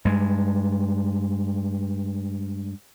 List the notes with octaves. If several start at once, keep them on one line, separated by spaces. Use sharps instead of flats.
G2 G#3